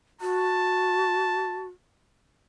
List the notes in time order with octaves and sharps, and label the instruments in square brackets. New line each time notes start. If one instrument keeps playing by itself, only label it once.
[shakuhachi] F#4 [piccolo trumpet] A5